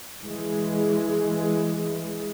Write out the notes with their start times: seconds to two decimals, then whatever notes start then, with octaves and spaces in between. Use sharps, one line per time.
0.21 E3 G#3